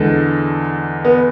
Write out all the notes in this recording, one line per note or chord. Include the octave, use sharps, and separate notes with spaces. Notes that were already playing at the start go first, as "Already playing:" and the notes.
Already playing: E2 D3 G#3 A4
B3